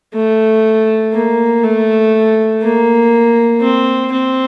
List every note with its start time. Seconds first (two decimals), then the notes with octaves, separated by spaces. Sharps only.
0.14 A3
1.13 A#3
1.64 A3
2.62 A#3
3.61 C4
4.12 C4